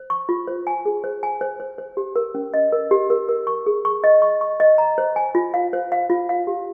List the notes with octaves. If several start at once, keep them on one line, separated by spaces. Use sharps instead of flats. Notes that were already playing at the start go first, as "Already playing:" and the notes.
Already playing: C5
C#6
F4
C5
G#5
G#4
C5
G#5
C5
C5
C5
G4
A#4
C#4
D#5
A#4
G4
A#4
A#4
C#6
G#4
C#6
D#5
C#6
C#6
D#5
A#5
C5
G#5
F4
F5
C5
F5
F4
F5
G4